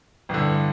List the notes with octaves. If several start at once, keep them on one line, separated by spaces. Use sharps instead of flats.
A1 G2 D3